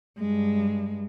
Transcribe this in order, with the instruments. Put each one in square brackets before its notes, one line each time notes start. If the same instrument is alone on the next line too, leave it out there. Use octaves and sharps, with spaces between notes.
[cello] G2 G#3